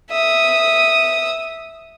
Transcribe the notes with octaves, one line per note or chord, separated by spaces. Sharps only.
E5 D#6